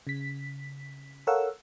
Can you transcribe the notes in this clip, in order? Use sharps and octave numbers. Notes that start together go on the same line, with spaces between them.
C#3 B6
A4 A#4 C#5 F5 F#5 E6